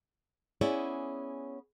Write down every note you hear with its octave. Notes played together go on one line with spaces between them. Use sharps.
B3 C#4 E4 G#4 C#5 D5